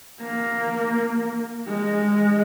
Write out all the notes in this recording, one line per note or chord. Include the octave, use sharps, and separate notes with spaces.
A#3
G#3